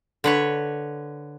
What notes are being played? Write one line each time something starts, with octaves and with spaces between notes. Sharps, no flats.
D3 B4 C#5